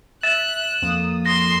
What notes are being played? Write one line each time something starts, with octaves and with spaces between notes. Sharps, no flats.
E5 F#6 A6 E7
F2 A#3 D#6
C6 A#6